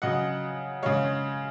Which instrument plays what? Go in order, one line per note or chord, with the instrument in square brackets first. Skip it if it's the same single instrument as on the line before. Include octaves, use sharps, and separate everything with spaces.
[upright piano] C#3 F#3 D#5 F#5
C#3 G#3 C#5 F5